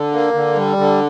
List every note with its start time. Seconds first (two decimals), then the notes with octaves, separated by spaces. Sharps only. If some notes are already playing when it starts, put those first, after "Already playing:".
Already playing: D3
0.13 A#3
0.34 D3
0.56 G3
0.77 D3